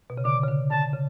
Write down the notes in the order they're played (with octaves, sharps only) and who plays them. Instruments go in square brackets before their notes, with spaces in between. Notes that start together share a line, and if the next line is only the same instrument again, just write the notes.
[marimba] B2
C#3
[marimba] D3 [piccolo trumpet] D6
[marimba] C#3
D3
[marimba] D3 [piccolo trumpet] A5
[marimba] C#3